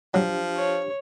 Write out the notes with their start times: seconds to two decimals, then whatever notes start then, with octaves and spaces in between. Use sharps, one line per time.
0.14 F3 F#3 D4 G4
0.56 C#5